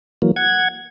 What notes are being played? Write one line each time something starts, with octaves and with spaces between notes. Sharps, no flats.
E3 F#3 A#3
F#5 G#6